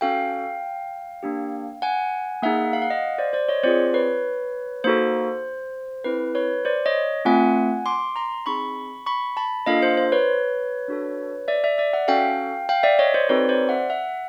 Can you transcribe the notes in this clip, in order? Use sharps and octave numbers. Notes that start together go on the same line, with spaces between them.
C#4 F#4 A4 F5 G5
A#3 D4 G4
F#5 G#5
A#3 D#4 G#4 E5 F#5
F5
F#5
D#5 F5
C5 D5
C5 D5
C#5 D#5
C4 F4 G#4 C5 D5
B4 C#5
A#3 D#4 F#4 A4 C5
C4 E4 A4 B4
B4 C#5
C5 D5
C#5 D#5
A3 C4 F4 F#5 G#5
C6 D6
A#5 C6
C4 D#4 G#4 B5 C#6
B5 C#6
A5 B5
A#3 D4 F4 A4 D#5 F5
C5
C5
B4 C#5
D4 F#4 A4
D5 E5
D5 E5
D5 E5
E5 F#5
C#4 F#4 A4 F5 G5
F5 G5
D5 E5
C#5 D#5
C5 D5
C4 D#4 F#4 A4 B4 C#5
C5 D5
E5 F#5
E5 F#5